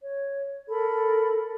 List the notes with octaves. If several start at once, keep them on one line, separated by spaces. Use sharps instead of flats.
C#5
A4 A#4 B5